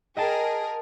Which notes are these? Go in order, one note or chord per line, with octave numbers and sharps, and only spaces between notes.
G#4 A#4 D#5 G5 A5